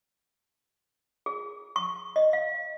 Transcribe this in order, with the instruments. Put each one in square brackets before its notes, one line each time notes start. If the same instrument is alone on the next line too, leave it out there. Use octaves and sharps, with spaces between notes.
[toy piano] G#4
C#6
D#5
F5